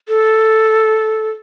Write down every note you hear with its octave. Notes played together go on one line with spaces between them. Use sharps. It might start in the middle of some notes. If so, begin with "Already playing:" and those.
A4